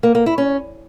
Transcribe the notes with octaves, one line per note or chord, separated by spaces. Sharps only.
A#3
A#3
E4
C#4